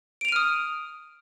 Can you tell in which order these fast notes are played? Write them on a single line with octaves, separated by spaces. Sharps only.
D7 F7 D#7 F6 D#6